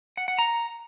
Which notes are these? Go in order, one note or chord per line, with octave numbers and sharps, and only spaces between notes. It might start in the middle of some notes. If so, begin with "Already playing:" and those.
F#5
F#5
A#5